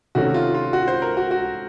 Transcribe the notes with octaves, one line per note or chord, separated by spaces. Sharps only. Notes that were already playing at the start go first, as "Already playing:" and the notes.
C3 D#3 A3 C#4 F#4
F4
F4
F#4
C5
A#4
F#4
F#4